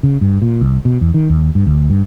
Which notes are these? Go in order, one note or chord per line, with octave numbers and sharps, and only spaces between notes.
C#3
G2
A#2
C2
B2
E2
D#3
D#2
G2
D2
G2